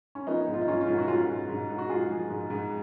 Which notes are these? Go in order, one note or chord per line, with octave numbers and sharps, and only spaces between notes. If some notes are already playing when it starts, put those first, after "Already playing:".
C#4
F3 B3 D#4
G#2
F4
D#4
G#2 C#4 F4
C#4 F4
G#2
F#4
G#2 C#4 F4
G#2
G#2
G#2
F#4
G#2 F4 G#4
F3
G#2
G#2